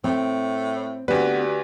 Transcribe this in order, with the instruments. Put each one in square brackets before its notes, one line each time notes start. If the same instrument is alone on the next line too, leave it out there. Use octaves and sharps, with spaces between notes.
[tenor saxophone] A2 [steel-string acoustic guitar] C4
[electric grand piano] D2 B4 [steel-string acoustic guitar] B3 C4 [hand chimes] F#4 G4 D5